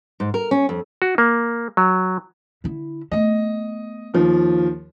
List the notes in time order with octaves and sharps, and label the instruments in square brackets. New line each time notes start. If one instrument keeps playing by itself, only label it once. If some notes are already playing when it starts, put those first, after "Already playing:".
[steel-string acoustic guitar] G#2
A#4
C#4
F2
[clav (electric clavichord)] F#4
A#3
F#3
[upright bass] D3 E4
[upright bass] A3 B3 [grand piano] D#5
[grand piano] D#2 F3